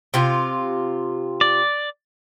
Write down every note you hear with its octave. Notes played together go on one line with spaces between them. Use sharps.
C3 F4
D5